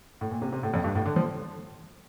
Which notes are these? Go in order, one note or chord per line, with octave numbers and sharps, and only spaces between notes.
A2
A#2
C3
C3
A2
F2
G2
A2
D3
F3